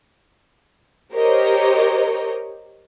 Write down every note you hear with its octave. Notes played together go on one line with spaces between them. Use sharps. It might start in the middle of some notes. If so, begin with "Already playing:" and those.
G4 A#4 C5 C#5 D#5